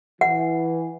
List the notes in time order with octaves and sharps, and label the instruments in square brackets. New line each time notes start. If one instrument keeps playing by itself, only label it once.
[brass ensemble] E3 [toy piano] F#5